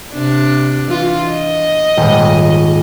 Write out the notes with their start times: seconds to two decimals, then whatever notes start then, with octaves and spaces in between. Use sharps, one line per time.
0.13 C3 D4
0.88 E3 F4
1.29 D#5
1.97 D#1 G#2